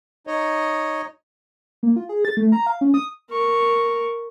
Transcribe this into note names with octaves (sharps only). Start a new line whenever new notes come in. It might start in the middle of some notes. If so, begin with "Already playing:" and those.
D#4 C#5 D#5
A#3
F4
G#4
A6
A3
A#5
F5
C#4
D#6
A#4 C#6